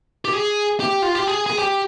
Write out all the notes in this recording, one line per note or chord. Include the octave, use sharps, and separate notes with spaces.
G4
G#4
G4
F4
G4
G#4
G#4
G4